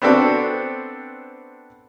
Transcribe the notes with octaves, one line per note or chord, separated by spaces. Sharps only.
B3 C4 D4 F#4 A4